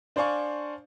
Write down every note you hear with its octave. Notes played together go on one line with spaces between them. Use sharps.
D4 C5 D5 F5 G#5 C#6